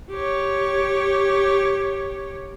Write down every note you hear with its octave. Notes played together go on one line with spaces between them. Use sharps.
G4 C#5